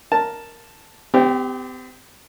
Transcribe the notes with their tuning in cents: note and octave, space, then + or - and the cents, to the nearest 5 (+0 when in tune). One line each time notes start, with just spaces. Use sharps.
A#4 +0 A5 +0
C4 -45 G4 +5